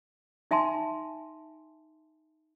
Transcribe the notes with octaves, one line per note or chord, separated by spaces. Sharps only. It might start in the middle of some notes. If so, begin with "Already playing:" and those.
D#4 E5 G#5 A5 C6